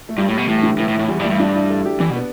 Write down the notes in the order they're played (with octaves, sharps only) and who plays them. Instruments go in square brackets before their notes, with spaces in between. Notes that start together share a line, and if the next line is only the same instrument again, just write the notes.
[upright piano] A3
[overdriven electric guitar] G2 [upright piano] G3
[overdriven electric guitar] A2
[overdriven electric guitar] B2 [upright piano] A3
[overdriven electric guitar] A2 [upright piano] E3
[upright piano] D3
[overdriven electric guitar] A2 [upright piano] E3
[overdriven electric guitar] A2
[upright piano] E3
[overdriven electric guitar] A2
[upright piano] E3
[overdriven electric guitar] E2 [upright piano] G3
[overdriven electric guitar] G2
[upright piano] A3
[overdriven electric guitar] G2
[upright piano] D4
E4
A4
G4
[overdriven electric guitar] E3 [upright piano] D4
[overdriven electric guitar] B2
[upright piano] B3